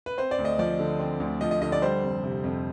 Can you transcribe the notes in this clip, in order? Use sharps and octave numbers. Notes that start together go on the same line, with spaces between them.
B4
C4 C5
D5
D2
D#5
F3 D5
D3
C4
D2
F3 D#5
D#5
D3 D#5
D5
G3 C5
F1
C3
F2